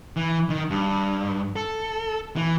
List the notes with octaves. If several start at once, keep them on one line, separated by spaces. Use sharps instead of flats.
E3
D#3
G2
A4
E3